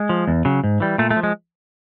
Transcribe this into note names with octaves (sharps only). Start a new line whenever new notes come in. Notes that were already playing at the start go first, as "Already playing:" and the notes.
Already playing: G#3
F3
E2
C#3 F#3
G#2
E3 G3
A#2 A3
A3
F3
G#3